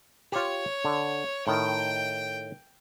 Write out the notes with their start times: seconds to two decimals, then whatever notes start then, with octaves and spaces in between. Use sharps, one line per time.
0.32 F4 G4 C#5
0.85 D3
1.47 A2 D#3 G5